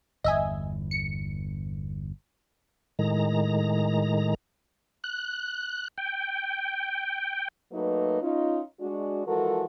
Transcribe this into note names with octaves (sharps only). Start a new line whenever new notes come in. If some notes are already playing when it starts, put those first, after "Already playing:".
G1 E2 D#5 E5 G#5
C#7
A2 D#3 G#3 A#5
F#6
G5
F#3 A3 A#3 D#4 B4
C#4 D#4 F4
G#3 D4 F#4
E3 F3 G#3 F#4 A4 A#4